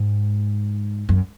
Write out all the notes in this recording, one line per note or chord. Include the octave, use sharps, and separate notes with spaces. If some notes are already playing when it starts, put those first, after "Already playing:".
Already playing: G#2
F#2